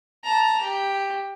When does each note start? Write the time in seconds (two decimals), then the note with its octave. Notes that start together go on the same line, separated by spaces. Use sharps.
0.24 A5 A#5
0.61 G4